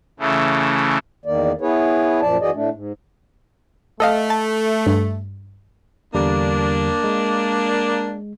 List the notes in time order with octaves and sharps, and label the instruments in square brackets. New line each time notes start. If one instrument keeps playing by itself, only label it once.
[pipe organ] C#3 E3 A3
[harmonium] E2 D#3 A#3 D5
B3 E4 G#4 B4 C#5
F#2 A#2 F3 D5 A5
F#2 E3 F#4 G#4 D5 D#5
A2 A3 D4
G#2
[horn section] A3 [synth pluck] A4 D#5 F5
[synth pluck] A5
G2
[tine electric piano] E2 D3 G3 [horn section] A#3 D4
[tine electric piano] G#3